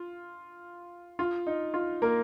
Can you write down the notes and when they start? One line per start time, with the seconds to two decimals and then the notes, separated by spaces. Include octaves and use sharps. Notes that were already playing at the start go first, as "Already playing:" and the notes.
Already playing: F4
1.19 F4
1.47 D#4
1.74 F4
2.02 A#3 A#4